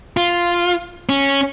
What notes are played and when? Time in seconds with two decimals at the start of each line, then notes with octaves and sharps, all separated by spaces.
0.17 F4
1.09 C#4